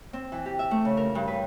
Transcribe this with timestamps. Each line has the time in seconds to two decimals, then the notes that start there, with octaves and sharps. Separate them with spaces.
0.13 C4
0.32 E3
0.46 G4
0.59 E5
0.71 A3
0.85 C#3
0.97 A#4
1.15 G2
1.28 B4